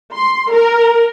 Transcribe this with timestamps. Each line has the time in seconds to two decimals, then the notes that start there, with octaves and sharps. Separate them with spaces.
0.14 C6
0.52 A#4